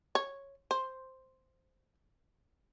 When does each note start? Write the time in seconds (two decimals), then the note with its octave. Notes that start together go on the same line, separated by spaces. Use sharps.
0.15 C#5
0.71 C5